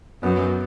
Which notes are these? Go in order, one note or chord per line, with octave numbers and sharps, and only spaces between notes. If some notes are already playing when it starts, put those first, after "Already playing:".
F#2 B3